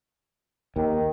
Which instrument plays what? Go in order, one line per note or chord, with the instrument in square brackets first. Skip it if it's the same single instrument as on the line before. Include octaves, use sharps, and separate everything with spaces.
[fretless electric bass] D#2 [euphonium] D#3